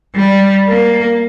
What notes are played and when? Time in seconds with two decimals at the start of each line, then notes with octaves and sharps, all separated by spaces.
0.15 G3
0.68 A#3